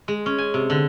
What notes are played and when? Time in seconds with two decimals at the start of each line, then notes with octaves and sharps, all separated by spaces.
0.08 G#3
0.26 C#4
0.38 G#5
0.54 C3
0.70 D3